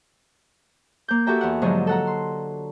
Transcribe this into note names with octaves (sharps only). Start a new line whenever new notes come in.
A#3 G6
F#4 G4 A4 E5 G5 A#5
E2 F#5
G#2 D3 F3 F#3 D#5
A4 F#5 A#5
C6